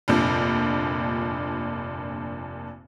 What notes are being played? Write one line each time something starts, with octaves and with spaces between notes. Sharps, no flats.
F1 G2 A#2 F3